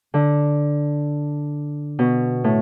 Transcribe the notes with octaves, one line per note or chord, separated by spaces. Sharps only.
D3
B2
A2